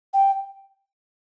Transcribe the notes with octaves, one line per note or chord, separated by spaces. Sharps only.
G5